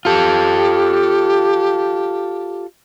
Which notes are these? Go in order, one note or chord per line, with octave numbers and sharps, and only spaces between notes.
F4 G4 A4